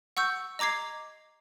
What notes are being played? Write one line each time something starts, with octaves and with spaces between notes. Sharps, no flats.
F#5 C#6 E6 G6
D#5 A#5 D6 G#6 C7